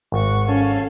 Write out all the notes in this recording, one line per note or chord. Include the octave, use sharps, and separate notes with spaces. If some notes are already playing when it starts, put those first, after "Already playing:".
G#1 F#5 C#6
C#4 A4 F5